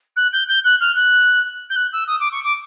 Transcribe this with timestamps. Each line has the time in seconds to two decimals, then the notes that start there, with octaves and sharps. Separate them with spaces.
0.16 F#6
0.32 G6
0.48 G6
0.64 F#6
0.80 F6
0.96 F#6
1.69 G6
1.76 F#6
1.92 E6
2.07 D#6
2.20 D6
2.31 C#6
2.44 D6